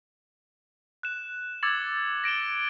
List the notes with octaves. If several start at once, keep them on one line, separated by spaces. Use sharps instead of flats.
F#6 E7
D6 E6 G#6 A6 C#7 F#7
A#6 D7 E7 G7